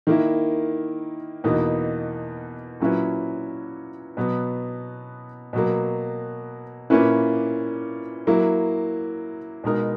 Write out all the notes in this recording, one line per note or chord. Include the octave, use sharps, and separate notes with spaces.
D#3 A#3 E4
E2 B2 A#3 D#4
A#2 F#3 C#4 E4 B4
B2 F#3 B3
B2 F#3 A#3
A#2 A#3 C#4 E4 B4
F#3 A#3 E4
B2 G#3 D#4 A#4